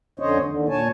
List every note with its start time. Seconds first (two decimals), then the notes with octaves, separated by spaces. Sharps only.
0.20 F2 D3 C#4 C5 C#5 D#5
0.45 D#2 D3
0.69 A#2 C#5 G#5 A5